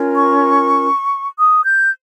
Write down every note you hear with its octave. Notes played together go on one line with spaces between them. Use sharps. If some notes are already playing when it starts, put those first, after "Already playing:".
Already playing: C#4 F4 A#4
C#6
D#6
G6